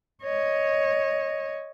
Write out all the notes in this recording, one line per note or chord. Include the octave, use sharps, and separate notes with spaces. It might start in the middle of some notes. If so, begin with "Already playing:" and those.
C#5 D#5